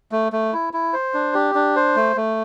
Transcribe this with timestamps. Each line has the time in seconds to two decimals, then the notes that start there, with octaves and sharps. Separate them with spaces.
0.12 A3
0.32 A3
0.53 E4
0.73 E4
0.93 C5
1.14 D4
1.34 G4
1.55 D4
1.76 C5
1.96 A3
2.17 A3